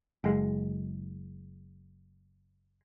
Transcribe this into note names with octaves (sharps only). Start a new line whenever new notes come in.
F#1 G#3